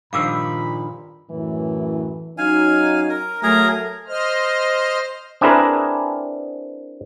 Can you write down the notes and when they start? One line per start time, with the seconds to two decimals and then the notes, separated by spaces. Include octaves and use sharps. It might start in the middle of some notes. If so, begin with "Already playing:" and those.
0.13 G2 A#2 D#3 F3 F5 B5 D6 E6
1.30 F#2 A2 E3
2.38 F#3 C#4 D#4 F5 G#5
3.10 A#4
3.43 F#3 A3 G#4 A#4 A#5
4.08 C5 D#5 F6
5.41 C4 D4 E4 G#4 A#4 B4